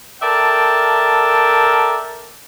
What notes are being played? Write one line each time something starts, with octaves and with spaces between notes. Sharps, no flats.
A4 A#4 D5 E5 G5 A5